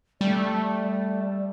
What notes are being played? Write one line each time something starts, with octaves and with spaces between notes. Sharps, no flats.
G3 A3 D5